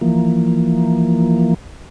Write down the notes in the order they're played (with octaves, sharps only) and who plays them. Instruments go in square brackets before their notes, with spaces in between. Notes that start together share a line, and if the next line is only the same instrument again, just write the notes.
[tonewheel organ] E3 F3 A#3